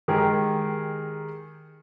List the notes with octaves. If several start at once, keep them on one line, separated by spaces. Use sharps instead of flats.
D#3 G#3 G4 G#4 A#4